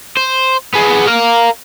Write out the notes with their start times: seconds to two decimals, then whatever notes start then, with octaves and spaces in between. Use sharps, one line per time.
0.17 C5
0.74 B3 G#4
1.07 A#4 F5